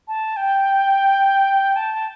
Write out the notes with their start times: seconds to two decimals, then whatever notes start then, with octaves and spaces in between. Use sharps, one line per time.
0.08 A5
0.37 G5
1.76 A5